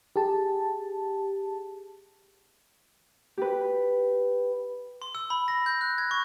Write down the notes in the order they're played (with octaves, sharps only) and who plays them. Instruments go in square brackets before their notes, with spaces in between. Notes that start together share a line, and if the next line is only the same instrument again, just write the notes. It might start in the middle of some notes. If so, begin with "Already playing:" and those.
[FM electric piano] G4 G#4 A5
[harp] G4 B4
[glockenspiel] C6
E6
B5
A#6
G6
F#6
G#6
C#6